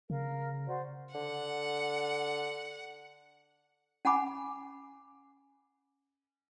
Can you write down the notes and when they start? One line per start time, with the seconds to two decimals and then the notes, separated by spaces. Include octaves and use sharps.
0.10 C#3 A#4 F5
0.67 F#4 C5 D5
1.15 D3 F#5
4.05 C#4 F#5 G#5 B5 D6